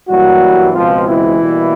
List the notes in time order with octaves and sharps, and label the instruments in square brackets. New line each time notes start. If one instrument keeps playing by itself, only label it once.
[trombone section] G2 E3 F#3 G3 A#3 F#4
C#2 B2 F3 G#3 C4 F4
E3 E4
B2 G3 A#3